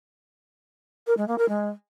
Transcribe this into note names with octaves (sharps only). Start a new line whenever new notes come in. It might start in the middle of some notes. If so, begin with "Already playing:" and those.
A#4
G#3
A#3
A#4
G#3